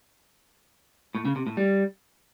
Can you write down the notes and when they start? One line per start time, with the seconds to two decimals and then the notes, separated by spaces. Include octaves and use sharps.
1.15 A2
1.25 C#3
1.36 C3
1.47 A2
1.57 G3